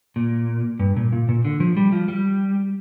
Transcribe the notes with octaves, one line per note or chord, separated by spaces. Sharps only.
A#2
G2
A#2
A#2
A#2
D3
F3
G3
F3
G3